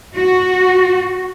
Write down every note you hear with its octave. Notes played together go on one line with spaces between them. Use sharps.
F#4